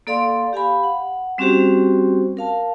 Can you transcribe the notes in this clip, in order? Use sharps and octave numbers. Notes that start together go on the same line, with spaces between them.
A#3 A4 D5 F5 C6
G4 F5 G#5 B5
F#5
G3 C4 C#4 F#4 G4 C5
A#4 F5 A5